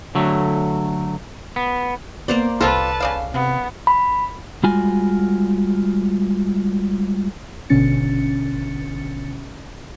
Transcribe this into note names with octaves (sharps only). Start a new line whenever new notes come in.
D3 F#3 A3
B3
A#3 B3 C5 D5
C2 G3 C4 F4 A4 B4 A5
C#3 D5 F5
C3 B3
B5
G3 G#3 F4 F#4 G#5
G#1 B2 D3 C#4 A6 C#7